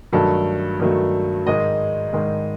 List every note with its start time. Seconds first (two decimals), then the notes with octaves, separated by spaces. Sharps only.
0.12 G2 D#3 F#3 A3 A4
0.79 G2 D#3 F#3 A3
1.46 G#2 D#3 G#3 D#5
2.13 G#2 D#3 G#3